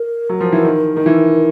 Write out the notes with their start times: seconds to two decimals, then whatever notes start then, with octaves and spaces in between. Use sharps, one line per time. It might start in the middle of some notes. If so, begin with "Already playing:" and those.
Already playing: A#4
0.29 F#3
0.40 F3
0.52 E3
0.64 D#3
0.97 D#3
1.06 E3